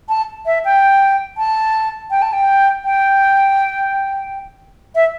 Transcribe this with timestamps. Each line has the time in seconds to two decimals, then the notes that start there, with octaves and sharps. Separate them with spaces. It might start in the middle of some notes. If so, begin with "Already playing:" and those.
0.09 A5
0.46 E5
0.65 G5
1.38 A5
2.11 G5
2.22 A5
2.33 G5
2.85 G5
4.95 E5